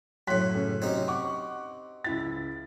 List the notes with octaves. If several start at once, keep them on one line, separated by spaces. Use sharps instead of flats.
F#2 A2 C6 F#6 B6
C#3 A3 C#4
C3 F#3 C4 C#4 D#4 G4
F#5 C#6 D6
C#2 E4 A6